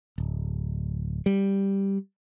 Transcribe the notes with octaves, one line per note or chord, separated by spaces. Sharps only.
D1
G3